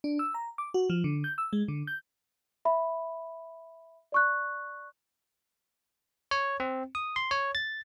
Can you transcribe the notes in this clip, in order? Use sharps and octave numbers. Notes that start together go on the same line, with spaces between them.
D4
E6
A#5
D6
F#4
F3
D3
G6
E6
G#3
D3
G6
E5 B5
D5 C#6 F#6
C#5
C4
D#6
C6
C#5
A6